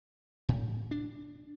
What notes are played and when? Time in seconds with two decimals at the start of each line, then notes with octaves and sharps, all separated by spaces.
0.49 A2
0.91 D4